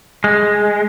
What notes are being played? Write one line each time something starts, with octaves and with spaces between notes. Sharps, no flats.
G#3